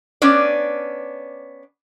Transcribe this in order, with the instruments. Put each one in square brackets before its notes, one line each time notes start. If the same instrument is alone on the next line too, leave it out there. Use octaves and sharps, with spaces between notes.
[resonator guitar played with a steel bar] B3 C#4 D4 D5